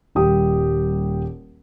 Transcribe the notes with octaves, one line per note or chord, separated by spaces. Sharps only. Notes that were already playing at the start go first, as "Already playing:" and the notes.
D#1 G3 G4 D#6